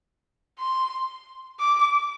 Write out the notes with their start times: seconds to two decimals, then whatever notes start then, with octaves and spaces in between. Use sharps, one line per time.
0.59 C6
1.60 D6